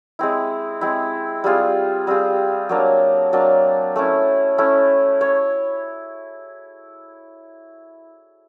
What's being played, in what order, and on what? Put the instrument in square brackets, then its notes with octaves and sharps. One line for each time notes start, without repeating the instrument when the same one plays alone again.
[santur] G#3 C4 E4
G#3 C4 E4
G3 C4 F4 G#4
G3 C4 F4 G#4
F#3 A#3 D4
F#3 A#3 D4
A3 C#4 E4
A3 C#4 E4
C#5